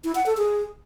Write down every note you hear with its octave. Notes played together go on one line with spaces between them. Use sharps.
E4
F#5
A4
G#4